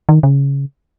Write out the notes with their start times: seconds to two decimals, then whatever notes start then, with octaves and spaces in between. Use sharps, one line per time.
0.09 D#3
0.23 C#3